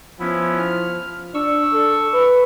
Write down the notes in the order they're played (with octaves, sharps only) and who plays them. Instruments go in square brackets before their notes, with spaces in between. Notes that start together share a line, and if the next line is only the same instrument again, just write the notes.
[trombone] F3 [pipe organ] B3 C#4 E4
[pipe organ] F6
[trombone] D4 [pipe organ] C#6 E6
[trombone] A4
B4